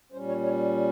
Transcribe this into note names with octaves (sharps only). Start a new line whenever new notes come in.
A#2 G3 C#4 C5
C#5
C#5